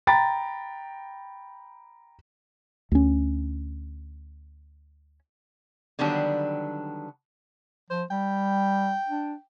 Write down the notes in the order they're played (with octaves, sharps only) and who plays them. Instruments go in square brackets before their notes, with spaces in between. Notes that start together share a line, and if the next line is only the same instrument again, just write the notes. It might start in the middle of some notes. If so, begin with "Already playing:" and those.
[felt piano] G5 A#5 B5 A6
[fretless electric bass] D2 C#4
[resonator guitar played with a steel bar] D3 D#3 F#3 G3 B3 D4
[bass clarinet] F3 [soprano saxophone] C5
[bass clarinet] G3 [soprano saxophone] G5
[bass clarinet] D4